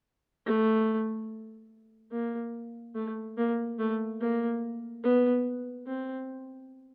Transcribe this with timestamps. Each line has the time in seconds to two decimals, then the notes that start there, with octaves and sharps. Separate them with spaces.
0.46 A3
2.12 A#3
2.95 A3
3.38 A#3
3.79 A3
4.20 A#3
5.04 B3
5.87 C4